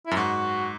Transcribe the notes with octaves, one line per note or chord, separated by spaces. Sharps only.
E4
F#2
G#2 F#4